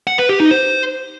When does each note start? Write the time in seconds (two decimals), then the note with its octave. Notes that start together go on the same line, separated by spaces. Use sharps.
0.07 F#5
0.18 B4
0.29 G4
0.40 D#4
0.51 C5